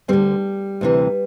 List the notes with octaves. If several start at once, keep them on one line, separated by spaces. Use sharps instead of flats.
D2 D3 G3 C4
D2 C3 E3